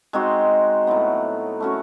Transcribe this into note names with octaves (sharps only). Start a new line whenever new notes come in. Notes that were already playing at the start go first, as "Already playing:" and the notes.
G#3 C4 D#4 F#4
A2 F#3 B3
A3 C#4 F#4 A#4